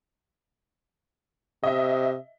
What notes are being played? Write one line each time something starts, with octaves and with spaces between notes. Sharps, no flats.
C3 D#5 E5